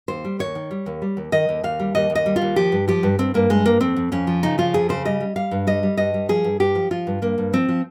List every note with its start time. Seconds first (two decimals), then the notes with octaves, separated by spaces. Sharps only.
0.08 D#2 C5
0.25 G3
0.39 D#2 C#5
0.55 D#3
0.71 G3
0.86 D#2
1.02 G3
1.17 D#2
1.32 D#3 D#5
1.49 D#2
1.63 D#2 F5
1.80 G3
1.95 D#2 D#5
2.10 D#2
2.15 D#5
2.26 G3
2.36 F4
2.41 D#2
2.56 F3 G4
2.72 G2
2.88 F3 G4
3.03 G2
3.18 G2 C4
3.34 G2 A#3
3.50 G2 G#3
3.65 G2 A#3
3.81 F2 C4
3.96 F2
4.12 F2 C#4
4.27 F3
4.43 C#3 D#4
4.58 F3 F4
4.74 F2 G#4
4.89 C#3 C5
5.05 G3 D#5
5.20 G3
5.36 G3 F5
5.51 G2
5.67 G3 D#5
5.83 G3
5.97 G2 D#5
6.14 G3
6.29 F3 G#4
6.44 G2
6.60 G2 G4
6.75 F3
6.91 F3 F4
7.07 G2
7.22 G2 A#3
7.38 G2
7.53 F3 C4
7.69 F3